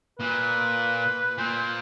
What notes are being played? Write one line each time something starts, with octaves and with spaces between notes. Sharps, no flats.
A#2 B4
A#2 C5